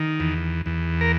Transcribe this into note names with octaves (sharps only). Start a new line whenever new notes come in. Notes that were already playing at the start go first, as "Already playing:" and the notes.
Already playing: D#3
E2
E2
A#4